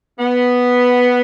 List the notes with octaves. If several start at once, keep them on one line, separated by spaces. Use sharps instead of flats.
B3